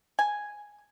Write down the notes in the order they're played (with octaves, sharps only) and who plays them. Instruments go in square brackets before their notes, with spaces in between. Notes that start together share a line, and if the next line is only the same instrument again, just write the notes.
[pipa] G#5